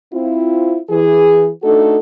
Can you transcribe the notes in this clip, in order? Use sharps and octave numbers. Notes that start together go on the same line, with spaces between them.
C4 E4 F4
E3 G#4
A3 D4 D#4 F#4 A4